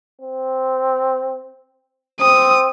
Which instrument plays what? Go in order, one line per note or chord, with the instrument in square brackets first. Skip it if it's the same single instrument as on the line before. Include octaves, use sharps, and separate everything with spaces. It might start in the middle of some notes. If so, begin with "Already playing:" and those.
[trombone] C4
[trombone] C4 [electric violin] D#6